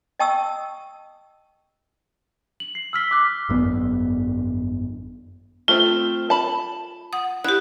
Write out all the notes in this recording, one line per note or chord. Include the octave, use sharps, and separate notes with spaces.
D#5 G5 A5 C#6 D#6 E6
F#7
C7
E6 F6 B6 G7
D6 F#6
G#1 F#2 B3
A3 C4 F4
A5 B5
F#5 D#6
E4 G4 F#6